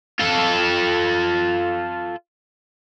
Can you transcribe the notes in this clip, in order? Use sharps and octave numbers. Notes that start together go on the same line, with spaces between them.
F4 A4